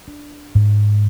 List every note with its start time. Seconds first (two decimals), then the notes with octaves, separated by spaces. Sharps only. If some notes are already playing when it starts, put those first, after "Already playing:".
0.08 D4
0.55 G#2